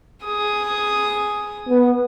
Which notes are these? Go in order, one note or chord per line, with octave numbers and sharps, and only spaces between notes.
G#4 D#6
B3